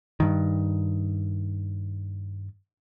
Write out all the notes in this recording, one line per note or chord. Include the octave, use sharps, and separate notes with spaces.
G2 D#3